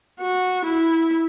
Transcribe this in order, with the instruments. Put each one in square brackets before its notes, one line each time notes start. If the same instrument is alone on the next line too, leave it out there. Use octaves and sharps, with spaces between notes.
[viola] F#4
E4